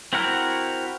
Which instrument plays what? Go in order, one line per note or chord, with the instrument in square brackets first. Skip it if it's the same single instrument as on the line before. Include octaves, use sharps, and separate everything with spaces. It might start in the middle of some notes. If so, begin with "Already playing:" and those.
[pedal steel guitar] C4 E4 F#4 A#4 F#5